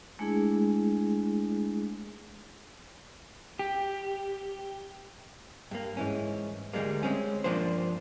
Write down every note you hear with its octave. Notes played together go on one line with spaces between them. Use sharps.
G#3 A3 D4 E4 G#4
G4
G2 A#3
G#2 E3 C#4
D2 G2 G3 G#3 A#3
G#3 C4 C#4
G2 F3 A#3 D4 C5